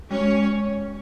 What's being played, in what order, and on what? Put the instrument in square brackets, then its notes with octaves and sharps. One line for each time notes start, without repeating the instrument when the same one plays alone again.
[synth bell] G#3 [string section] C#4 C#5